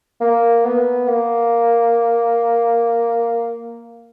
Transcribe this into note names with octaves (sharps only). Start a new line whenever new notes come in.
A#3
B3
A#3